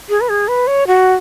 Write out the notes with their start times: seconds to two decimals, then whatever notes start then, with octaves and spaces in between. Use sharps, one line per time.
0.09 G#4
0.21 B4
0.29 G#4
0.48 B4
0.67 C#5
0.87 F#4